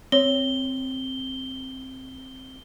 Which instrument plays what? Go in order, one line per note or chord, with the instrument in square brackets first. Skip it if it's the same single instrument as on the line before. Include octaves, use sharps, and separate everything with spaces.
[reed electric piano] C4 [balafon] C#5 [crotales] G7